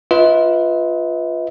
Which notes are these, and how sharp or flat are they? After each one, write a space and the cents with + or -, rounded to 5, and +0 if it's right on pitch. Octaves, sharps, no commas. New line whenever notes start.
F4 +0 B4 +0 D#5 +45